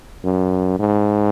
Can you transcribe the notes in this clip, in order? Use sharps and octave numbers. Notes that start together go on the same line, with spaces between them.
F#2
G#2